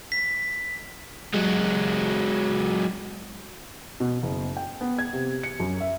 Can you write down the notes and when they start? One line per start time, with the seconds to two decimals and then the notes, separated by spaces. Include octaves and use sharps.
0.12 B6
1.34 F#3 G#3
4.00 B2
4.23 F#1
4.57 G5
4.81 B3
4.98 G#6
5.13 C3
5.43 C#7
5.60 F#2
5.80 E5